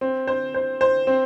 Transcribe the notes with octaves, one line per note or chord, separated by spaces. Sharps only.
C4
C5
C5
C5
C4